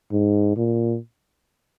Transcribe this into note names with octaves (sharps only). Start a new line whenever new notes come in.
G#2
A#2